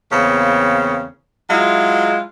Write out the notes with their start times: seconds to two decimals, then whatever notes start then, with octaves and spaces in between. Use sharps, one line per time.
0.12 E2 C#3 A#3 C4
1.50 F#3 G#3 E4 F4